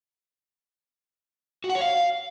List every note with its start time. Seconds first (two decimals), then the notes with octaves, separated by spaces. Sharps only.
1.64 F#4
1.70 F#5
1.75 C#5
1.81 F5